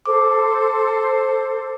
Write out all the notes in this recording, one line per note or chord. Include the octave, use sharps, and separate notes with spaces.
A4 C5 D6